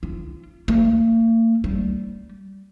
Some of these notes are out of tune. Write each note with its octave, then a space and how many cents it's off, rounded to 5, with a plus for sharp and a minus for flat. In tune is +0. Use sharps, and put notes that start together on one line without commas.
F4 -30
A#3 -45
G3 -20